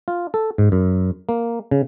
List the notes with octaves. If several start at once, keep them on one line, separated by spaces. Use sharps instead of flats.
F4
A4
G#2
F#2
A#3
C#3